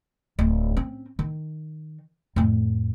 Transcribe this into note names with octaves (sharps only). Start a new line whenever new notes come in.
D1
C4 C#4
D#3
F2 A2